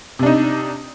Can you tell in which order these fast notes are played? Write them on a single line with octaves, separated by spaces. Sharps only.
C3 D4 D#4